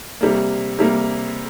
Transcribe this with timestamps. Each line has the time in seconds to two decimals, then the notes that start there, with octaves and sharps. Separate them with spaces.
0.21 C3 G3 A#3
0.79 C3 G3 A#3